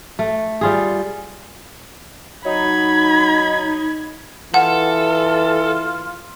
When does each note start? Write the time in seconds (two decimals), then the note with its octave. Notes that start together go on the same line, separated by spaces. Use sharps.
0.19 A3
0.61 G3 F4 G#4
2.45 F#3 D#4 B5 G#6
4.54 E3 F4 A4 F#5